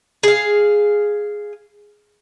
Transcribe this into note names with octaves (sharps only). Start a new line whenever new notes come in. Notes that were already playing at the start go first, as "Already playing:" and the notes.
G#4 F5